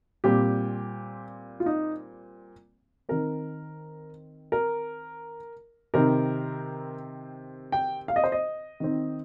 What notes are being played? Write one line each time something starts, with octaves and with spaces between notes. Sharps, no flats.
A#2 G3 C4 G4
F4
D#4
D#3 C4 A#4
A#4
C3 D#3 C4 A#4
G5
F5
D#5
C5
D#5
D#3 C4